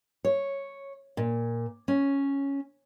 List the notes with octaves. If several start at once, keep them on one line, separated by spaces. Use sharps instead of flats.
C#5
A#2
C#4